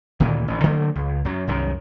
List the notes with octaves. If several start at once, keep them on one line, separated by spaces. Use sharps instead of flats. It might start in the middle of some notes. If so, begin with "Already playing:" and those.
D2 A#2 D#3 E3
A1 D2
D3 F#3 A3 A#3
C#2
F#2 F#3
C2 F#2 D#3